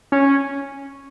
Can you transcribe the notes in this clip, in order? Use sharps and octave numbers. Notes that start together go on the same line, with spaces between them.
C#4